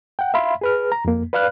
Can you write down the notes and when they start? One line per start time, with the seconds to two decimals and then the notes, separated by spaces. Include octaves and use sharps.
0.19 F#5 G5
0.34 E5 F5 B5 C6
0.61 G#4 B4 F6
0.92 A#5
1.05 F2 A#3
1.33 B4 D5 F5 B5 F6 F#6